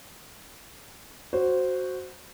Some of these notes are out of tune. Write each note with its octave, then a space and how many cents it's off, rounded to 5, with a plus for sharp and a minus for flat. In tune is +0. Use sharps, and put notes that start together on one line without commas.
F#4 +0 C5 +0